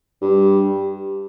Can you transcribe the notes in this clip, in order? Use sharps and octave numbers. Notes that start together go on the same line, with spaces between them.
G2